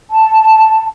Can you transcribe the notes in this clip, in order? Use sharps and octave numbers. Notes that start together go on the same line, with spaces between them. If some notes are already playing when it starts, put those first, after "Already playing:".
A5